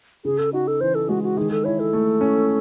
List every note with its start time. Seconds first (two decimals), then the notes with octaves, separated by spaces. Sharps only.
0.25 C#3 G#4
0.38 A4
0.53 D#4 F#4
0.68 A4
0.81 E3 C5
0.95 A4
1.09 G#3 F#4
1.23 F#4
1.37 D#3 G#4
1.52 A4
1.64 E4 C#5
1.80 A4
1.93 A3
2.21 C#4